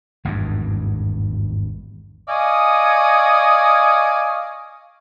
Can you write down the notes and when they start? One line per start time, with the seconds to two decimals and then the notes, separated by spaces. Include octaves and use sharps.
0.25 G#1 E2 G2
2.29 D5 D#5 F5 G#5 C#6 D#6